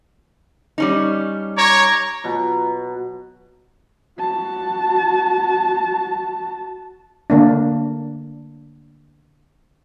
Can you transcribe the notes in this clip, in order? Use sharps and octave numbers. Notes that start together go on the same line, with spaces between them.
G3 C#4 D#4
C#5 A#5 D6
B2 F#3 F4 A#5
F#4 A5
D3 A#3 D4